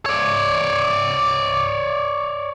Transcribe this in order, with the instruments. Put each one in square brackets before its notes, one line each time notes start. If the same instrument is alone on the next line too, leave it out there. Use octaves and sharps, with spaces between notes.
[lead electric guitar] C#5 D5